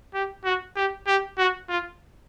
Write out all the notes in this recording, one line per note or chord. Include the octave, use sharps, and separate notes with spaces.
G4
F#4
G4
G4
F#4
F4